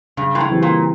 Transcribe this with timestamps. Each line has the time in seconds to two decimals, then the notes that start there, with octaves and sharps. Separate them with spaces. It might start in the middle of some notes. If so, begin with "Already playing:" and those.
0.17 G2 C#3
0.35 A#2
0.40 A2
0.50 E3 G3 C4
0.62 A#2